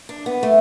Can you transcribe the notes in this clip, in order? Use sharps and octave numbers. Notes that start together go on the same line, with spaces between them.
D4
B3
A3